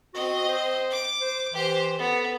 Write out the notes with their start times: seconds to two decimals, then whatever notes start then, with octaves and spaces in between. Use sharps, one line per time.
0.14 C4 F#4 D#5
0.49 C5
0.91 D6
1.21 C5
1.53 E3 G4 C5
1.99 B3 A4